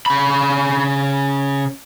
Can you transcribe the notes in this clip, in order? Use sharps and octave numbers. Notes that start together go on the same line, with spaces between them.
C#3 B5